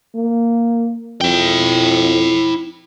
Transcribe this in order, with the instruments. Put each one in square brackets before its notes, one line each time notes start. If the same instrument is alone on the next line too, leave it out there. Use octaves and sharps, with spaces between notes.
[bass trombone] A#3
[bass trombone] F2 [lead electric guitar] E4 G5